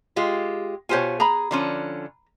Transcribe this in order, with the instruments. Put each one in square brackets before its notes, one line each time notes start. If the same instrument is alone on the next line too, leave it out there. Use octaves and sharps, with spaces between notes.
[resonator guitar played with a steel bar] G#3 F4 G4
[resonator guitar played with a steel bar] B2 C5 G#5 [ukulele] F4 G4 C#5
[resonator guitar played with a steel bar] G#4 [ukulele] A#5 B5
[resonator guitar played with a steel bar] D3 F3 C#4